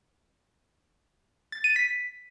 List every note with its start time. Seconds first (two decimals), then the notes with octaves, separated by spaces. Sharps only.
1.52 A6
1.64 D#7
1.76 B6